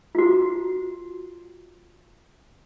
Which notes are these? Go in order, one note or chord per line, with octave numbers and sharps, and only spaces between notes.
F4 F#4